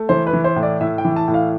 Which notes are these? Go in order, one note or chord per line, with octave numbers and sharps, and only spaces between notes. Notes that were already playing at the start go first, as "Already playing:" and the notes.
Already playing: A3
E3 C5
B4
E3
C5
A2
D5
A2 E5
G5
E3
A5
A2
F5